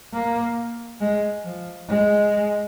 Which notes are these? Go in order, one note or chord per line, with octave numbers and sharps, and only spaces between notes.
A#3
G#3
F3
G#3